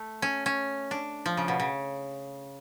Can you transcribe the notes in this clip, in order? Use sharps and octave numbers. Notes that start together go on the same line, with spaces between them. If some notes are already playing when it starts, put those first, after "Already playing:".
Already playing: A3
C#4
C#4
D4
F3
C#3
B2
C#3